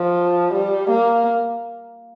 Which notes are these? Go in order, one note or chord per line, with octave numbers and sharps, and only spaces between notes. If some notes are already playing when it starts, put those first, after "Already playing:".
Already playing: F3
G3
A#3